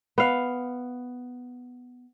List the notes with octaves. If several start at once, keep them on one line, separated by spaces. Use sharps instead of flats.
B3 F5